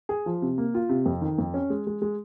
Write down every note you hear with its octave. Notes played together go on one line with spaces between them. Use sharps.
G#4
F3
C3
A#3
F4
C3
F2
D#3
F2
C#4
G#3
G#3
G#3